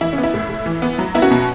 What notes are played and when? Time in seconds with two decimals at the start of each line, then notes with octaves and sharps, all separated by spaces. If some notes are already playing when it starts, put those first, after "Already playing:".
0.01 E3 E4
0.13 C#4
0.18 B3
0.23 E4
0.34 A2
0.49 A2
0.66 E3
0.82 B3
0.99 F#3
1.15 B3 E4
1.22 C#4 F#4
1.31 B2